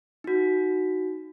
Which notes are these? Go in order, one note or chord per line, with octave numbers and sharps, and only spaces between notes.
D#4 F#4